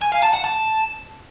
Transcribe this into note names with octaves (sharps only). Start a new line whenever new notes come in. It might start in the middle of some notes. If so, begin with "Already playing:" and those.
G#5
F5
A5
F#5
A5